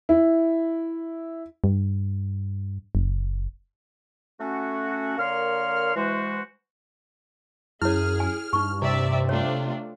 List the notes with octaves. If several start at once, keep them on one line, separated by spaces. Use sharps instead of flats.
E4
G2
F#1
A3 C#4 F#4
D3 A#3 A#4 C#5 C6 F6
E3 G#3 F#4 C5
F#2 E4 G#4 C#5 F6
G#5
G2 D#4 C#6
C3 D5 E5
A3 D4 F4 C#5